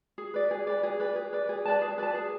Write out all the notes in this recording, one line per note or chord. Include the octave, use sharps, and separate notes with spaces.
G#4
B4 D5
G#4
B4 D5
G#4
B4 D5
G#4
B4 D5
G#4
B4 D5 A5
G#4
B4 D5 A5
G#4